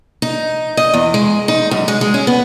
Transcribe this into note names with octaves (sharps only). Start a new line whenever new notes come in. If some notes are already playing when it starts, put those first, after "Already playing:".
D#4
D#5
E2
G#3
D#4
F#2
G#3
G#3
C#4
B3